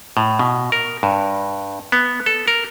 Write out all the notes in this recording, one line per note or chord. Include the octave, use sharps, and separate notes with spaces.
A2
B2
A#4
G2
B3
A4
A#4